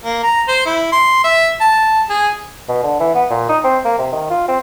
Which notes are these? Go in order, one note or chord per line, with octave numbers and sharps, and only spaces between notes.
A#3
A#5
C5
E4
C6
E5
A5
G#4
B2
D3
E3
B3
A#2
D#4
C4
A#3
C3
D#3
F4
C4